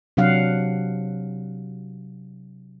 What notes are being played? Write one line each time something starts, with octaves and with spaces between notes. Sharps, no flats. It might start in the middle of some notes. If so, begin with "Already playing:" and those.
C3 F#3 D4 F5 F#5